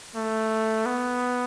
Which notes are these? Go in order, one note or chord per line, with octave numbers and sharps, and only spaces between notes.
A3
B3